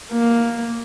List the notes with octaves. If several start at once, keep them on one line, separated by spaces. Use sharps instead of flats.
A#3